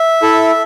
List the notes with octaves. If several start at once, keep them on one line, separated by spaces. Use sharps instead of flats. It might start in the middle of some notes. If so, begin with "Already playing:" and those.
Already playing: E5
E4 A4